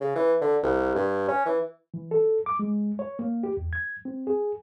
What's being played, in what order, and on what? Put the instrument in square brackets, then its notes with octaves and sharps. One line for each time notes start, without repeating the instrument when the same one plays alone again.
[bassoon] C#3
E3
D3
C2
G2
C#4
E3
[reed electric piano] E3
A4
D6
G#3
C#5
A#3
G4
E2
G#6
C4
G#4